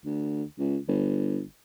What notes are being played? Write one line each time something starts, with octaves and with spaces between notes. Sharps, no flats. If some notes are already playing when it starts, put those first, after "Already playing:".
D2
C#2
G1